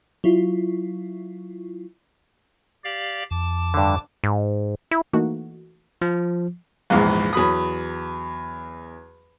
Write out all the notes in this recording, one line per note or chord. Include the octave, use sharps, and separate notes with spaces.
F#3 E4 F4
G4 D5 F5
F2 A5 D6
G2 D3
G#2
E4
E3 A3 A#3 D#4 F#4
F3
A#1 E2 G#2
E2 F#3 B5 D#6